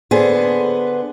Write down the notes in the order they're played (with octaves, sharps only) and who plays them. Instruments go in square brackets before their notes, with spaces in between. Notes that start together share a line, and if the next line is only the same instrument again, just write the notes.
[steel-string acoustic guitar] D3 B3 G#4 C5